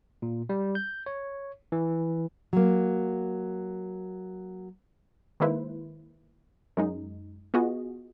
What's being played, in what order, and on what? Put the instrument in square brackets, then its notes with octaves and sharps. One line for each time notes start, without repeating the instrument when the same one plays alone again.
[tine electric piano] A#2
G3
G6
C#5
E3
[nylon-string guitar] F#3 A#3
[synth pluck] D#3 G#3 A#3 E4 B4 C5
F#2 G#3 D#4
B3 F4 F#4 G#4 D#5